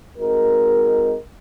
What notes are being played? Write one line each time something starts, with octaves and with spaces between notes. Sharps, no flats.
G#3 C4 D#4 F#4 A#4